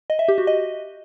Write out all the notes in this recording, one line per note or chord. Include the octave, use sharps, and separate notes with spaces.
D#5
E5
G4
F#4
D#5